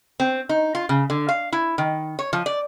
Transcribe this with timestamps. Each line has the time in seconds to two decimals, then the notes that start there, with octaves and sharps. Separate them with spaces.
0.20 C4
0.49 D#4
0.75 F4
0.89 C#3
1.10 D3
1.29 F5
1.52 E4
1.78 D#3
2.19 C#5
2.33 F3
2.46 D5